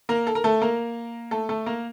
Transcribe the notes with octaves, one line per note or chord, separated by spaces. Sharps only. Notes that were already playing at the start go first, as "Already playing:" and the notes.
A#3 A#4
A4
A#4
A3 A4
A#3 A#4
A3 A4
A3 A4
A#3 A#4